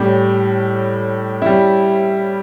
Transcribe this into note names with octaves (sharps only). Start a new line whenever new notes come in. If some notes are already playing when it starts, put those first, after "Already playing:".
Already playing: A2 G3 C#4
G3 C#4 E4